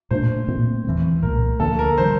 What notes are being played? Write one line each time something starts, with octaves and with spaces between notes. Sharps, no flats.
A#2 A3 D4 C5
A#2 A3 C4
E2 E3 G3 C4
C2 A#2 F3 A3 A#4
D2 D3 F3 A#3 A4
A#4
D3 G3 C5